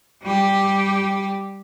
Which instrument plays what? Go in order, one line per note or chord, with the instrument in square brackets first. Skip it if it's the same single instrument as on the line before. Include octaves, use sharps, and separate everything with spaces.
[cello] G3 G4